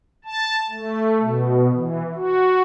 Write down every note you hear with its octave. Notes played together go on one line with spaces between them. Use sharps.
A5
A3
B2
E3
F#4